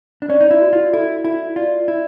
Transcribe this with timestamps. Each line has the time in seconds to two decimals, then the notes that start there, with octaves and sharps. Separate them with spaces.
0.22 D4
0.29 C#4 D5
0.41 D#4
0.51 E4
0.61 F#4
0.73 F4
0.93 E4 A4
1.24 E4 A4
1.56 F4 D5
1.88 E4 D5